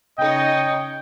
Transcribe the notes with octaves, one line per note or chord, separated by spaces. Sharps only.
C#3 D#4 C#5 D#5 G5